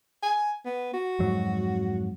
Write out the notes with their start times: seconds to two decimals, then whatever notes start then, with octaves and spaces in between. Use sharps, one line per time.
0.23 G#5
0.65 B3
0.93 F#4
1.19 F2 G#2 F#3